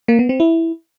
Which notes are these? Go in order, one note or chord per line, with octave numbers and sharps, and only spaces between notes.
A#3
B3
C4
E4